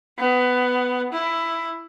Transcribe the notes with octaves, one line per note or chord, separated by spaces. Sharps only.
B3
E4